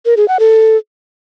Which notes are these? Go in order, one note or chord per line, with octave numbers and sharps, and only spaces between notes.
A#4
G#4
F#5
A4